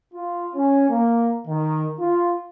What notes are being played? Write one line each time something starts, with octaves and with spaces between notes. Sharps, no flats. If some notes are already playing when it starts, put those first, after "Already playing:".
F4
C#4
A#3
D#3
F4